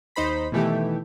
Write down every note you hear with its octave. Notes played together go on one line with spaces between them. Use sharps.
D#2 D#4 C5 B5 B6
B2 D#3 E3 A3 E4 G4